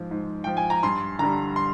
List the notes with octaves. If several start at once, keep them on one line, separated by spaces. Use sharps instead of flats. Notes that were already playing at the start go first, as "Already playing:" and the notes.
Already playing: G#2 F3
G#2
F3 G5
G#5
A#5
G2 C6
D3 G3 A#5
C6